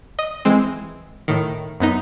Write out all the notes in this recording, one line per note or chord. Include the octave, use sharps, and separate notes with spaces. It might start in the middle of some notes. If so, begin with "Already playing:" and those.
D#5
E3 G#3 C4
A2 D#3
F#2 B3 D#4